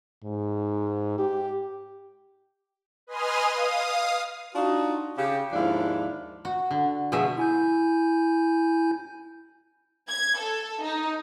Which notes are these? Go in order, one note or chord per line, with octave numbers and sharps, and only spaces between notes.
G#2
G4
B4 D#5 G#5 C6 D#6 F6
F5 D#6
D4 D#4 F4 F#4
C#3 G4
D#2 G#2 F3 D4 E4 F5
F#4
D3
B2 F3 G#3 F#4 E5
E4 G#5 G6
G#6
A4
D#4